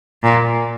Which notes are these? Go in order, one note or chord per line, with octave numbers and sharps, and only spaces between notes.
A#2